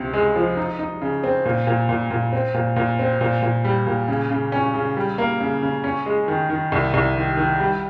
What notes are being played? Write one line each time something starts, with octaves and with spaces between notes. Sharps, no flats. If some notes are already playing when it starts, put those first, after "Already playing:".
Already playing: C#2 C3
G#3
F3
D#4
D#4
C#3
C4
A#2
A#2
A#2
A#2
C4
A#2
A#2
C4
A#2
A#2
G3
A#2
C#3
C#3
C#4
C#3
G3
A#3
C#3
C#3
C#4
G#3
D#3
D#3
C2
C2
D#3
D#3
G3